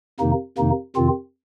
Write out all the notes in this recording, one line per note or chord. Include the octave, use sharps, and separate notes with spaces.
F2 C3 D#3 A#3 D#4
F2 C3 D#3 A#3 D#4
F2 C3 D#3 C4 F4